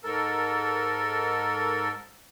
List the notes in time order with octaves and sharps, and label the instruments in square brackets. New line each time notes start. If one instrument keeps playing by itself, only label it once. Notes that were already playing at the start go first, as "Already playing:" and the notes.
[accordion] G#2 A4 A#4